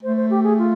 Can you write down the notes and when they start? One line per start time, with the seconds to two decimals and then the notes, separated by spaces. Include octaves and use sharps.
0.03 A3 C5
0.17 C5
0.30 G4
0.44 G#4
0.58 F4